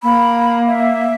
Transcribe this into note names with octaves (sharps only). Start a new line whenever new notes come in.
A#3 B5
E5